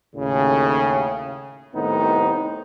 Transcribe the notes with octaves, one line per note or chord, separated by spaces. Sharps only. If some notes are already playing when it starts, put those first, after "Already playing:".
D#2 A2 C#3
C2 A2 D#3 B3 C4 D#4